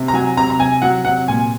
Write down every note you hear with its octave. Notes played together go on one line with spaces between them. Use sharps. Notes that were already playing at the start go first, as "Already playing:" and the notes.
Already playing: C3
A#5
F#3 G#5
C3 A#5
A#5
C3 G#5
F#3 F#5
C3 F#5
A#2 G#5